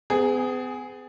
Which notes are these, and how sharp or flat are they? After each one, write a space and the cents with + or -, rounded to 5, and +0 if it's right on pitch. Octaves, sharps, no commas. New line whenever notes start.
B3 +45 G#4 +0